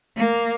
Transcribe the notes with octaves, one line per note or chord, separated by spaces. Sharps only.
A#3